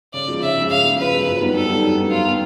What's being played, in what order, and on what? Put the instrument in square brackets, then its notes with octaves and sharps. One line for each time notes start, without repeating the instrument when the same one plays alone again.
[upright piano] C#3 [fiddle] D5
[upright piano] F3 G#3
[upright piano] C#3 [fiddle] E5
[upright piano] F3
G#3
[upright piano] C#3 [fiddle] F5
[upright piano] F3 G#3
[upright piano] C#3 [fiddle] B4
[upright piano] F3 G#3
F#2
D#3 G3 B3
[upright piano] F#2 [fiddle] A4
[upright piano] D#3 G3 B3
F#2
D#3 G3 B3
[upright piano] F#2 [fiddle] F4
[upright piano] D#3 G3 B3